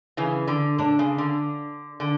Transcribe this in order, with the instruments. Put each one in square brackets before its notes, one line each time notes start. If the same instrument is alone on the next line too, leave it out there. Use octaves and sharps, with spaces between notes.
[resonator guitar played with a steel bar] C#3 E3
D3
[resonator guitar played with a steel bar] D3 [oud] D4
[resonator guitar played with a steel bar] C#3
D3
D3